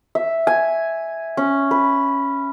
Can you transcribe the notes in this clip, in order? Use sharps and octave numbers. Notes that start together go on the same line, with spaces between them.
E5
G#5
C#4
B4